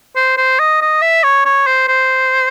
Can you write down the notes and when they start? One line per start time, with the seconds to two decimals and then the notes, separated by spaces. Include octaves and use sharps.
0.16 C5
0.37 C5
0.59 D#5
0.82 D#5
1.02 E5
1.24 C#5
1.45 C#5
1.67 C5
1.88 C5